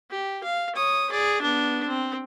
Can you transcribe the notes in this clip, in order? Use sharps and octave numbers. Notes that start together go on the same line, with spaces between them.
G4
F5
C#5 D#6
G#4 D5
B3 D4
C4